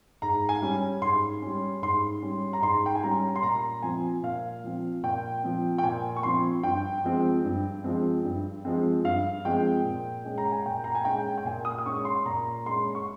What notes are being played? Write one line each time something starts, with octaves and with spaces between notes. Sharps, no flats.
G#2 A#5
G#5
G3 C#4
G#2 C6
G3 C#4
G#2 C6
G3 C#4
A#5
G#2 C6
G5
G#5
G3 C#4 A#5
C6
A#2 A#5
F3 C4 G#5
A#2 F5
F3 C4
A#2 G5
F3 C4
G5
A#2 G#5
C#6
F3 C4 C6
G2 G5
F3 G#3 C4
G2
F3 G#3 C4
G2
F3 G#3 C4
G2 F5
F3 G#3 C4 G5
A#2
G#3 C#4
A#5
G#5
A#2 G5
A#5
G#5
G#3 C#4 G5
G5
A#2 G#5
D#6
D#6
G#3 C#4 C#6
C6
A#2 A#5
G#3 C#4 C6
C#6